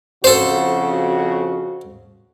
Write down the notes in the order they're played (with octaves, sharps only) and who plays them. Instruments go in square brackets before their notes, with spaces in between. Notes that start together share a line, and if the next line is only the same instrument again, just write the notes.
[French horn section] F2 C#3 F#4 [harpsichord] A4 C5